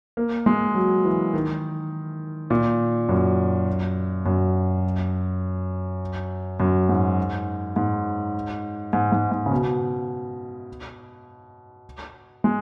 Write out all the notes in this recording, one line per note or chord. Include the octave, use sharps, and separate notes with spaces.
A#3
G#3
F#3
E3
D#3
A#2
F#2
F#2
F#2
G#2
G#2
G#2
G#2
G#2
C#3
B2
G#3